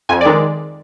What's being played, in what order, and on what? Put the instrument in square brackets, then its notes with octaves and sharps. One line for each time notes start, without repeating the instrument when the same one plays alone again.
[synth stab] F2 G#5
D5
D#3 G#3